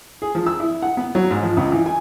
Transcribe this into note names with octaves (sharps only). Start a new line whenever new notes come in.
G#4
F3
E6
E4
F#5
B3
F#3
G#2
F3
C#2
E3
G#5